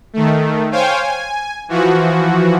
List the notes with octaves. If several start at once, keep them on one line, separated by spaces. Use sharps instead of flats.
D#3 A3
C5 C#5 F5 G5 G#5
G#5
E3 F3 F#4